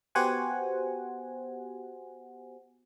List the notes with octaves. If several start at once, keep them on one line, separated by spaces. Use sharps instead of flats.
B3 F#4 G4 C5 F#5 G#5